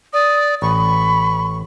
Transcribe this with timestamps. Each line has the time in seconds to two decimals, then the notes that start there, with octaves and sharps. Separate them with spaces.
0.13 D5 D#6
0.62 A1 B5 C#6